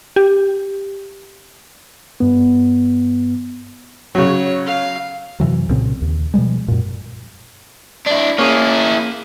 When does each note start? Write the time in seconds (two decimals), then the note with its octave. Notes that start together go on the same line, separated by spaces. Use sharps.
0.16 G4
2.20 G2 B3
4.15 C#3 F#3 C#5
4.67 F5
5.40 F#2 C3 E3 F#3
5.69 C2 A#2 C#3 C4
6.02 D#2
6.34 B2 F3 G3 G#3
6.68 F#2 A#2
8.06 D4 E4
8.38 A#3 C#4 E4 G#4